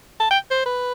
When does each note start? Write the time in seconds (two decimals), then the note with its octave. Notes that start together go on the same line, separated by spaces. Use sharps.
0.20 A5
0.31 G5
0.51 C5
0.66 B4